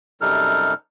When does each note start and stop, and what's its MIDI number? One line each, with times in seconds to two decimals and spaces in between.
0.21 0.74 42
0.21 0.74 48
0.21 0.74 55
0.21 0.74 63
0.21 0.74 69
0.21 0.74 89